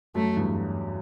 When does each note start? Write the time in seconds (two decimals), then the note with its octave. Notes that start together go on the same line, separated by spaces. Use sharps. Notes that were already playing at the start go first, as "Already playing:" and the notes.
0.15 F#2 A3
0.37 E2 G2